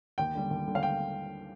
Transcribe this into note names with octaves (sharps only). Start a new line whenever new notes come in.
D#2 G5
D3 G3
D#2
D3 G3
F5
G5